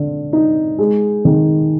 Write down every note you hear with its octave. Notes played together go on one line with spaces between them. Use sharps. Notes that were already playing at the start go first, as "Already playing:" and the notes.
Already playing: D3
D#4
G#3
D#3